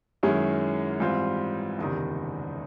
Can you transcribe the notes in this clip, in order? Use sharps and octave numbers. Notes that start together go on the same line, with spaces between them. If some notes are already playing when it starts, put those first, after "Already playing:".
F#2 D#3 G#3 C#4 E4
G#2 E3 G3 C4 F4
F#1 E2 C3 D#3